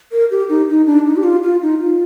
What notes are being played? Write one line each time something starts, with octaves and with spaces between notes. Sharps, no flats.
A#4
G4
D#4
D#4
D4
D#4
G4
F4
F4
D#4
F4